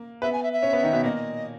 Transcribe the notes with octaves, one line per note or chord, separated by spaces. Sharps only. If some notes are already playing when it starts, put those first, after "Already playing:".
Already playing: A#3
B3 B4 E5
G#5
E5
E5
C#4 C#5
B3 B4
D#3 D#4
B2 B3
A#2 A#3 D#5